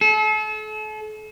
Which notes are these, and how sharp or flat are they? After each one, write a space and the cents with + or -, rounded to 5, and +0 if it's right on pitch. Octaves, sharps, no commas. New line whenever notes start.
A4 -40